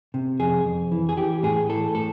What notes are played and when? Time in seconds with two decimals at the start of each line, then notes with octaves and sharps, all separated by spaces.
0.14 C3
0.40 F2 G#4
0.65 F2
0.92 E3
1.09 G#4
1.17 E3 G4
1.43 A2 G#4
1.69 E3 A4
1.95 A2 A4